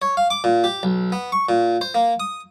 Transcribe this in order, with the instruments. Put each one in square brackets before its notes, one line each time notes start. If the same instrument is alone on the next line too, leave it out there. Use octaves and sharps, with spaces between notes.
[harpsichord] C#5
F5
D6
A#2
G4
B1
B3
C#6
A#2
C5
A#3
D#6